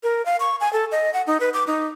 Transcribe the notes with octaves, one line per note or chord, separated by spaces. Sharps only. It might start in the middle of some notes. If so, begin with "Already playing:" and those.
A#4
F5
C#6
G#5
A4
D#5
F#5
D#4
B4
D6
D#4